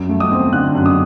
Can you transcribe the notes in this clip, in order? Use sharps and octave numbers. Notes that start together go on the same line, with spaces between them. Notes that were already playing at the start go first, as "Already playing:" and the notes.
Already playing: F#2
A3
D#6
C4
D3 F#6
F#2
D#6